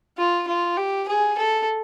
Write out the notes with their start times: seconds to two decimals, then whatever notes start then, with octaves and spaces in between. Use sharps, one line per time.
0.18 F4
0.47 F4
0.77 G4
1.08 G#4
1.38 A4